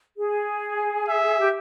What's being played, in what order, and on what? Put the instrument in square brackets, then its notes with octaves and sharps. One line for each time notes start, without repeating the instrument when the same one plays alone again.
[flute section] G#4
[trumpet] E5
[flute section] G4